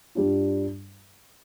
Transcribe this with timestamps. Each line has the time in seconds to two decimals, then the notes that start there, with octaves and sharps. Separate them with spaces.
0.15 G2 G3 D4 F4